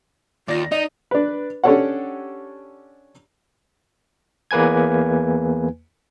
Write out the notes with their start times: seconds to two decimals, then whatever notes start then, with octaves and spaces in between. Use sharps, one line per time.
0.48 D#2 F4 D5 A#6
0.72 D#4 D5 D#5
1.11 D4 B4
1.64 C#4 D4 G4 A4 C#5 F#5
4.51 E2 A#3 B4 G#5 G#6